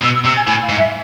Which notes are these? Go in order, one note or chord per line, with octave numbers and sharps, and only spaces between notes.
B2 E6
E6
C3 E6
G#5
A2 G#5
F5
G#2
E5